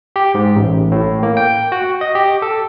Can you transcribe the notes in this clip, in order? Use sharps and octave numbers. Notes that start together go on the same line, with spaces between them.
G4
G#2
A1
A2
A#3
G5
F#4
D#5
G4
A4